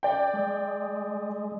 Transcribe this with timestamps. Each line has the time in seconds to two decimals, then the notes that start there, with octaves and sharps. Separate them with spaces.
0.03 D5 G5
0.34 G#3